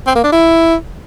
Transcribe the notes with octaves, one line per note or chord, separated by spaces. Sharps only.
C4
A#3
D4
E4